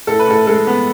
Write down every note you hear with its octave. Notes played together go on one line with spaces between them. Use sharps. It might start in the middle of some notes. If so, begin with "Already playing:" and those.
A2 A4
B4
A2 A4
G#3 A4
B3